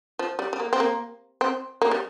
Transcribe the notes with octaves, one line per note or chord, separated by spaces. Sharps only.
F3
G3
G3
A#3
C4
A#3
C4
A#3
G3